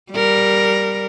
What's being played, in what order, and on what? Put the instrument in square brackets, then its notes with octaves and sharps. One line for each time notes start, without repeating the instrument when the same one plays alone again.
[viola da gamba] G3 A#4